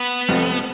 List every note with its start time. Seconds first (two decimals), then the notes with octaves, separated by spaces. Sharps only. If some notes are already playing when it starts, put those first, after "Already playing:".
Already playing: B3
0.28 F1 F2 F3